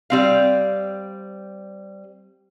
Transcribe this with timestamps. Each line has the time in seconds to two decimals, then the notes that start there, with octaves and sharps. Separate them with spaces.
0.10 G3 C4 F5